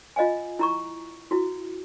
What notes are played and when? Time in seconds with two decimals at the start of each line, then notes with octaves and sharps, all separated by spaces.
0.16 F4 D#5 F5 G#5
0.59 E4 A#5 C#6
1.31 E4 F#4